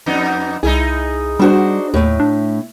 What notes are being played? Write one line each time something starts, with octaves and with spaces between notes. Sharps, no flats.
F2 B3 D#4
C2 D#4 E4 G#4
G3 D4 F#4 C5
D#2 A2 A3
D4